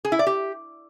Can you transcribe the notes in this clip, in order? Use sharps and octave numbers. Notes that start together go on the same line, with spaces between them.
G#4
E4
D5
G4